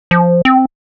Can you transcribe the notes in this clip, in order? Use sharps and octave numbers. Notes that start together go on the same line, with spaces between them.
F3
C4